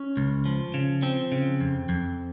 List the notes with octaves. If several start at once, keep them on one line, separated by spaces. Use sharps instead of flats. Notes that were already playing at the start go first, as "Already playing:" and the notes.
Already playing: C#4
C#2
F3
C#3
F3 C4
C#3
F2
F2